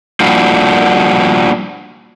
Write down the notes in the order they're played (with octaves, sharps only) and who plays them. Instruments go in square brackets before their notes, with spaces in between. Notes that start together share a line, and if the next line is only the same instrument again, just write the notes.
[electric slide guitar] F3 G3 A#3 D4 E4 F#4